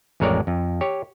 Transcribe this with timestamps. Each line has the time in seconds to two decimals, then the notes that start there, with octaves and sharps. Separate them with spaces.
0.20 A1 F2 G#3 A#4 C#5 D5
0.47 F2
0.81 G4 C#5